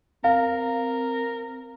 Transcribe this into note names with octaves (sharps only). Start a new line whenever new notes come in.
C4 A#4 F5